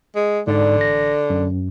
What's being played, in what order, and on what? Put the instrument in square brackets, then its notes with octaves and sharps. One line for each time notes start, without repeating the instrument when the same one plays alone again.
[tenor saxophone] G#3
[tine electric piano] G#2 D5 [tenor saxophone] D3
[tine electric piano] A1 A#6
F#2